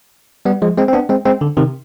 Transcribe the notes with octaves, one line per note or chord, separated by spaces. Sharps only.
G3 B3
F3 G#3
G#3 C4
C4
B3 D4
G#3 C4
G#3 C4
D3
C3 D#3